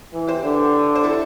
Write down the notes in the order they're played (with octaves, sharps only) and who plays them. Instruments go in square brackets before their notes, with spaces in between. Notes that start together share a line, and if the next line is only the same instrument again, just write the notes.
[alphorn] E3
[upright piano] G4 C5
[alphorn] D3
[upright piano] C5
E4 A4